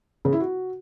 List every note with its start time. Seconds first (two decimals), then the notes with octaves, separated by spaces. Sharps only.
0.25 C#3
0.33 E4
0.40 F#4